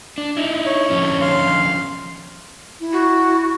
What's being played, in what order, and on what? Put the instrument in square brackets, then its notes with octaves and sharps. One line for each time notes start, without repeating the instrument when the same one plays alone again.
[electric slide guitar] D4
D#4 E4
[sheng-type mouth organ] C#5
[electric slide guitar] D3 F3 C#4
[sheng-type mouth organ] F5 C6
[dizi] E4
[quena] F#4